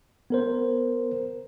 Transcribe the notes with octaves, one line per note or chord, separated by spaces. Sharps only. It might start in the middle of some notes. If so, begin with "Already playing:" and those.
B3 A#4 C5